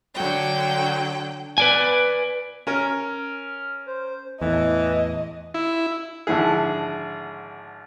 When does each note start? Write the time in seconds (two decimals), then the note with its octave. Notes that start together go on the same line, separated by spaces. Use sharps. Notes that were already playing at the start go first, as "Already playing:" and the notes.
0.15 D3 F#3 G5
1.58 B4 D5 G#5
2.67 C#4 A#4 F6
3.86 C5
4.42 E2 A2 E3 D#5
5.54 E4
6.27 G#1 D3 F3 E4 G#4